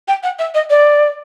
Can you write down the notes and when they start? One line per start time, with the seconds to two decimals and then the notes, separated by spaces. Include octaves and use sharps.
0.08 G5
0.23 F#5
0.39 E5
0.55 D#5
0.70 D5